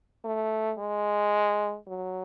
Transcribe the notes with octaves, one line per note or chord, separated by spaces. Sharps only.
A3
G#3
F#3